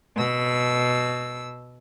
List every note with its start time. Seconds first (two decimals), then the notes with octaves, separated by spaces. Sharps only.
0.16 B2 E6